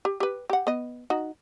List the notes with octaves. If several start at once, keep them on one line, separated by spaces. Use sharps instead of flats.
G4
G4 B4
G4 F#5
B3 D#5
D#4 F#4